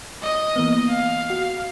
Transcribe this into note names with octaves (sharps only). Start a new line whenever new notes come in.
D#5
E3 A#3 B3
F5
F#4